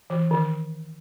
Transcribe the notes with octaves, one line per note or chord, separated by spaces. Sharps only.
E3
D#3